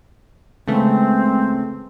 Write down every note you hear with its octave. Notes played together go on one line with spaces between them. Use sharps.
C#3 E3 G#3 A3 C4